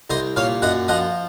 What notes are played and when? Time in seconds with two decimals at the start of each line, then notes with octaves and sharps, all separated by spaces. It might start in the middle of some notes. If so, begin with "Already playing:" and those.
0.10 C2 C5 D#5
0.36 A#2 C#5 F5
0.62 F#2 D#5 F#5
0.88 F3 D#5 F#5